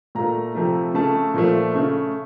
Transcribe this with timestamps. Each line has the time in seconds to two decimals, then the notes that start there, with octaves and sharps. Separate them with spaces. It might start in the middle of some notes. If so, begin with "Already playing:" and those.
0.15 A#2 A3 A#5
0.55 C3 F3 A3
0.94 C#3 A3 A5
1.34 A#2 F3 A3
1.75 C#3 A3